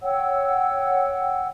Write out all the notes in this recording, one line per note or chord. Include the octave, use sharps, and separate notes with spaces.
C#5 F#5 G5 E6